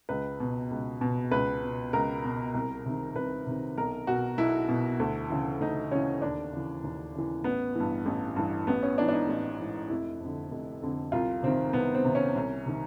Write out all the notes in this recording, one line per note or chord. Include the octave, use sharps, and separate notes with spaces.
C#2 B4
B2
C#2
B2
C#2 B4
B2
C#2 A#4
B2
C2
C3 D#3
C2 B4
C3 D#3
B1 A#4
B2 F#4
B1 E4
B2
D2
C#3 E3
D2 D#4
C#3 E3 C#4
D#2 D4
C#3 E3
D#2
C#3 E3
A1 B3
G2 E3
A1
G2 E3
A1 B3
C#4
G#2 E3 D4
D4
D#4
A1
G#2 E3
F1 E4
F2 D3
F1
F2 D3
C2 F4
C3 D#3 C4
C2 B3
C4
C3 D#3
C#4
C2
C3 D#3